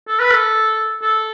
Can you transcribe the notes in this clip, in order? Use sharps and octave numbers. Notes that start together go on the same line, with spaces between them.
A4
B4
A4
A4